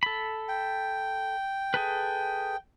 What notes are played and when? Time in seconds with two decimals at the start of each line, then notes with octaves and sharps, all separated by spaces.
0.03 A4 B5
0.49 G5
1.74 G#4 A4 B4